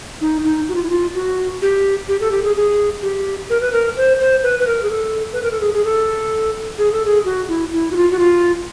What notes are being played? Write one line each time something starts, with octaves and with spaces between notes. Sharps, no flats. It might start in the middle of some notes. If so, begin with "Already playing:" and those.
D#4
D#4
F#4
F4
E4
F4
F#4
G4
G4
A4
G4
G#4
G#4
G4
A#4
B4
A#4
C5
C5
B4
B4
A#4
G#4
A4
B4
A#4
A4
G#4
G#4
A4
G#4
A4
G#4
F#4
E4
E4
F#4
F4
F#4
F4